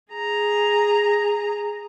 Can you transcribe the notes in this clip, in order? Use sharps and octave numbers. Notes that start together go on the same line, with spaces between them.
G#4 A#5